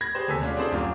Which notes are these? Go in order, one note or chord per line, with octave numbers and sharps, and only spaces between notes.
B5 G#6 A#6
G4 G#4 B4 C5
D#2 C3 A4 G#5 E6 B6
B2 G#3 C#4 D4 F4
C4 E4 G#4 A4 C5 D5
F1 A#1 F#2 F4 D6